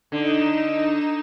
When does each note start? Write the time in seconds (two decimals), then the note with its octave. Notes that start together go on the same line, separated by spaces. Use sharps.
0.12 D3 D#4 E7